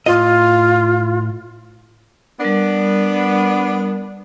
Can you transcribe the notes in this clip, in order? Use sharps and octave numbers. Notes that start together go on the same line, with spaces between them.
A2 F4 D#5
G3 B3 D4 A#4